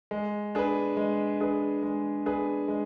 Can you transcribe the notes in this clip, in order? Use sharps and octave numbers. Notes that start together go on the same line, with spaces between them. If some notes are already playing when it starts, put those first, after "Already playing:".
G#3
D4 G#4 B4
G#3
D4 G#4 B4
G#3
D4 G#4 B4
G#3